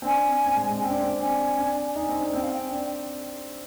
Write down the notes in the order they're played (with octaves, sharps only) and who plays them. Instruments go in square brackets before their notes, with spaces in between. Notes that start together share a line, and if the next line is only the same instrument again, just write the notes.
[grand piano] C4
[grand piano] D4 [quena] G#5
[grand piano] C4
G#3
G#3
[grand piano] C4 [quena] G5
[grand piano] D4
C4
[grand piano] D4 [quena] G#5
[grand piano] D4
[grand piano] D#4 [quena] G#5
[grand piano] C4
D4
[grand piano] C4 [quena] G5
[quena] F5
G5
[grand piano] D4